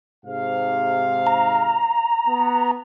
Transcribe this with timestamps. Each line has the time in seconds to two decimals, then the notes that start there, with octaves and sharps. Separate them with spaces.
0.25 G#2 C3 F5
1.27 A#5
2.28 B3